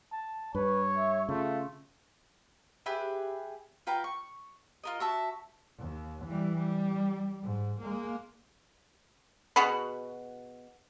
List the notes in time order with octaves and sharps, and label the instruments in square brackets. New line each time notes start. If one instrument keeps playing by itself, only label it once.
[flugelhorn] A5
[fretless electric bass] G2 [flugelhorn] B4 [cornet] C#5
[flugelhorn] E5
[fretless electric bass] C#3 [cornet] A3 [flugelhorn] F4
[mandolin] G4 G#4 B4 E5
F4 B4 G5 A#5
C#6
F4 A#4 D#5
F#4 E5 A5
[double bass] D#2
E3 G3
G3
G#2
G#3 A#3
[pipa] B2 F#4 G#4 B5